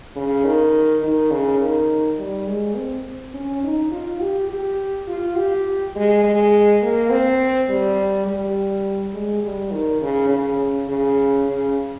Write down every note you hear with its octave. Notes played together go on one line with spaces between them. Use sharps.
C#3
D#3
D#3
C#3
D#3
G3
G#3
C4
C#4
D#4
F4
G4
G4
F4
G4
G#3
G#3
A#3
C4
G3
G3
G#3
G3
D#3
C#3
C#3
C#3
C#3